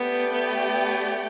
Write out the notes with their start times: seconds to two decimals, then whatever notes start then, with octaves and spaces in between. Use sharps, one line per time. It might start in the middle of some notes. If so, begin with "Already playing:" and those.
Already playing: A3 B3 G4 D5 G5
0.33 B3